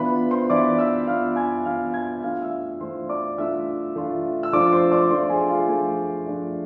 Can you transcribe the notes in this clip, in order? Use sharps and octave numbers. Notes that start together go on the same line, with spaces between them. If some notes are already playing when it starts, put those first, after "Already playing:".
Already playing: E3 B3 D4 F4 B4 B5
C5 C6
E3 B3 D4 F4 D5 D6
E5 E6
E3 B3 D4 F4 F5 F6
G#5 G#6
E3 B3 D4 F4 F5 F6
G#5 G#6
E3 A3 D4 F4 F5 F6
E5 E6
E3 A3 D4 F4 C5 C6
D5 D6
E3 A3 D4 F4 E5 E6
E3 A3 D4 F4
E6
F3 A3 D4 F4 D5 D6
C5 C6
D5 D6
F3 A3 D4 F4 C5 C6
G#4 G#5
F4 F5
F3 A3 D4 F4 G#4 G#5
F3 A3 D4 F4